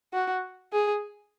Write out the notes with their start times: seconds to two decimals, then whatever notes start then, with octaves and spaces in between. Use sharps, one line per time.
0.13 F#4
0.72 G#4